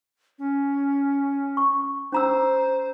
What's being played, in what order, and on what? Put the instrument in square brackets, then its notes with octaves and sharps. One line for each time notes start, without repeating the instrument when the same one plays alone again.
[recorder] C#4
[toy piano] C#6
[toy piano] C#4 A#5 E6 [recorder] C5